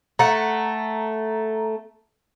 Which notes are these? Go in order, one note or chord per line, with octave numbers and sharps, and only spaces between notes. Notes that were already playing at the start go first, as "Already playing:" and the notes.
A3 F#5 A#5